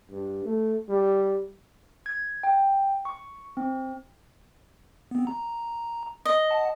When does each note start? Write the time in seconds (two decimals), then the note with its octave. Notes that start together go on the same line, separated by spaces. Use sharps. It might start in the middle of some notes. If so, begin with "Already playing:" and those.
0.11 G2
0.45 A3
0.89 G3
2.06 G#6
2.43 G5
3.05 C#6
3.57 C4
5.11 B3 C4
5.27 A#5
6.25 D#5
6.51 F#5 A5